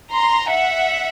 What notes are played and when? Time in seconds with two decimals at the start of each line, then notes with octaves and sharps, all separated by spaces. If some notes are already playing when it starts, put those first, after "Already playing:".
0.12 A#5 C6
0.50 E5 F#5